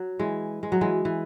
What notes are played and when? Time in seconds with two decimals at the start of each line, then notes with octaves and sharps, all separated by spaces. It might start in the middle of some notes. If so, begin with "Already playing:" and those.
Already playing: F#3
0.19 E3 G#3
0.63 G#3
0.72 F#3
0.81 E3 G#3
1.05 E3